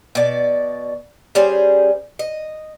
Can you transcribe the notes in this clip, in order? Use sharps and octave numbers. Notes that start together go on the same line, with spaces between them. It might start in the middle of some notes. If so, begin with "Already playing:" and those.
B2 D5
G3 C#4 G#4 C5
D#5